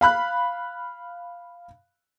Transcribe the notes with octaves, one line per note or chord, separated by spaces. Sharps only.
F5 B5 F#6